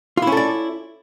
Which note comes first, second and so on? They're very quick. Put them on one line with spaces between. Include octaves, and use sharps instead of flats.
F4 E4 C#4 A4 D5